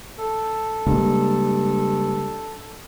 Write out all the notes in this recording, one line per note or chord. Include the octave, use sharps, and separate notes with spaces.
A4
G2 C#3 G#3 A#3